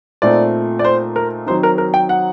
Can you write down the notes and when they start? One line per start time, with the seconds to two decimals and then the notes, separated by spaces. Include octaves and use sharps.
0.22 A#2 A3 C4 D#4 D5
0.79 D5
0.84 C5
1.16 A#4
1.47 D#3 F#3 C4 D#4 C5
1.63 A#4
1.78 A#4
1.94 G5
2.09 F#5